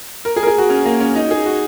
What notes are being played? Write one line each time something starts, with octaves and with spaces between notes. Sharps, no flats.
A#4
G#4
A#4
G#4
F#4
C#4
A#3
C#4
D#4
G#4
F#4